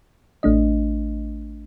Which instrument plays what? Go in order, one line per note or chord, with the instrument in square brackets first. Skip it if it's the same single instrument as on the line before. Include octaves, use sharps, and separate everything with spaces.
[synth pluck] A1 A3 D4 D#5